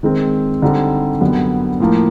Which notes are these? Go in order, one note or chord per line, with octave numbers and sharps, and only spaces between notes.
D#3 G#3 C4
D3 G3 C4 D#4 G4
F#2 D3 G3 B3
A2 F3 A#3